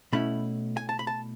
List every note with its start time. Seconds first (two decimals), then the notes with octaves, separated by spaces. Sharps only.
0.13 B2 A3 C#4 E4 B5
0.77 G#5
0.89 A5
0.99 B5
1.07 A5